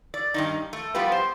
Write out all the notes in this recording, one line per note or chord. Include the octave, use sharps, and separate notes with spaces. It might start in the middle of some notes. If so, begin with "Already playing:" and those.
D5
G2 D#3 D#4
A3
F3 G3 B3 F4 G4 B4
C5